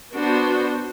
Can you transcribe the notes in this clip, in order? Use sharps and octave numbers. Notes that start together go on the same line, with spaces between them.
B3 D4 F#4 C5